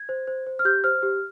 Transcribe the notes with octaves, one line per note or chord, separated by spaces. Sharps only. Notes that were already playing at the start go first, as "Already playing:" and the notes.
Already playing: G#6
C5
C5
C5
F6
G4 G6
C5 F6
G4